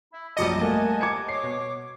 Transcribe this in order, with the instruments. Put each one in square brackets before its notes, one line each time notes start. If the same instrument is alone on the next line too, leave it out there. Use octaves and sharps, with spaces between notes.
[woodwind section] E4 E5 B5
[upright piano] A#1 F#2 C#7 [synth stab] G3 D#5 [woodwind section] A5 D6
[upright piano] A3 A#3 A4 [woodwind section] F#5 G#5 A5
[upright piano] D6 G#6 C#7
[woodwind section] C#5 D6 [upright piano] C7
[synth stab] B2